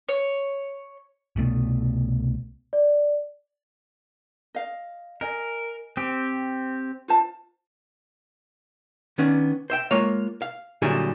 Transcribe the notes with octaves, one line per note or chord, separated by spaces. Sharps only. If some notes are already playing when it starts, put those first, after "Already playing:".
C#5
C2 B2 A3 B3
D5
D#5 F5
A#4 D#5 G#5
C4 G4
F4 C5 A5
D#3 B3 C#4 D4
C5 E5 G5
G#3 A#3 F4 C#5 F5
F5
A#2 D3 F#3 G3 E4 G#4